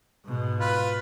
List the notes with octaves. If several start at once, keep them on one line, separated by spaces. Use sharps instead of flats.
G#2 B2
F4 B4